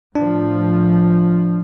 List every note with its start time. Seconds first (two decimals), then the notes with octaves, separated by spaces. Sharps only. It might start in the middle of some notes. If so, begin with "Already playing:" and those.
0.15 A2 F3 D4